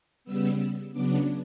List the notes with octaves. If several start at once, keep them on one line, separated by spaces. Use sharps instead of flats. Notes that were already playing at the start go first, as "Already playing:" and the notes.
C#3 G3 B3 E6
C#3 F#3 B3 D4 D6